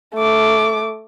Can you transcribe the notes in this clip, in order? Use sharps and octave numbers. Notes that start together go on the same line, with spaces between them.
A3 D6